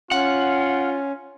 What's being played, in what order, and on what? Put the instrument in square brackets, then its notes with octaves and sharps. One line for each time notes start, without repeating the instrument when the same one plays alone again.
[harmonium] C#4 [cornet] F4 [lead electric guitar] F#5